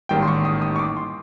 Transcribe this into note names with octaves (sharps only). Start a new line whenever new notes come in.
A1 G#2 D#3 G3 A#3 G5
C6
C#6
D#6
D#6
C#6
D6
C6